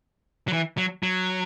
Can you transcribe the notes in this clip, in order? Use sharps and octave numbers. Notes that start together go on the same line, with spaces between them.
F#3
E3
F#3
F#3